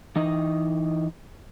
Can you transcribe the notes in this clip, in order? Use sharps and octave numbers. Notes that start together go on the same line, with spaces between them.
E3 D#4 D#5